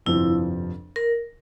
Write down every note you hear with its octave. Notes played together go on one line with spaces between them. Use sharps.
G1 F2 C3 F3 E4
A#4